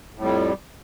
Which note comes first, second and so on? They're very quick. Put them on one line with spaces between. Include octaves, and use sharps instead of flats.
A2 F2 G3